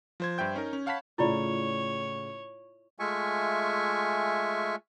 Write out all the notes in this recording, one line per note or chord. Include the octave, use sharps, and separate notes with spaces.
F3 C5 G#6
G2 C5 E5 G5 G6
C#4 D#4 A#4
C#4
C#5 F5 F#5 A5 B5 B6
A2 C#3 A3 E4 F4 C#5 D5
G#3 A3 F4 E5 G#5 C#6